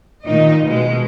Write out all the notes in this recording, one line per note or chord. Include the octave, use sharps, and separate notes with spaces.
A#2 D#3 D#4 D#5
B2 G#3